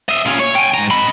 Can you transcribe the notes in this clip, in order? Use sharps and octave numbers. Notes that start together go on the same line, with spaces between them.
D#5 E5
A#2 C#4
C#5
G5 G#5
G#2 A#5
D#5 B5